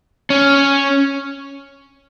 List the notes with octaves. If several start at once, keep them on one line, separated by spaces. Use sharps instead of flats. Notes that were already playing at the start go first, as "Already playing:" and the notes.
C#4